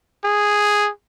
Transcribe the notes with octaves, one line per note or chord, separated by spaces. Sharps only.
G#4